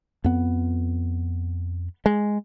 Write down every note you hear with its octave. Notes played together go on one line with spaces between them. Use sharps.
F2 B3
G#3